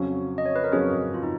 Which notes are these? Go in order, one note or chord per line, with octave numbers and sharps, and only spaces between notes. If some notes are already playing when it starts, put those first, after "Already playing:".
Already playing: F2 C#3 F#3 C#4
D#5
C#5
B4
A#4
F2 C#3 F#3 C#4 G#4
F4
D#4